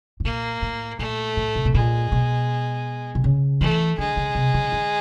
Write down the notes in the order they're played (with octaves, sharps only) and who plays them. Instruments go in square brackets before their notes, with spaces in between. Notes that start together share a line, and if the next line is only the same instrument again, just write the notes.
[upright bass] A2
[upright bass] A#2 [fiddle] A#3
[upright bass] A2
[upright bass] A#2 [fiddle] A3
[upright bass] A2
C3
B2
[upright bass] A#2 [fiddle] G#3
[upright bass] B2
C3
C#3
[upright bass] E3 [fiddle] A3
[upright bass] D3 [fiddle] G#3
[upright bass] C#3
C3
C#3
D3